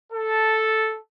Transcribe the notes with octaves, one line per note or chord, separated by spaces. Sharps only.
A4